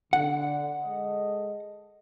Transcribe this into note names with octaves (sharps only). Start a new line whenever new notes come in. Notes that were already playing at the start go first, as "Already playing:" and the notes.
D3 F#5
G#3 A4 D#5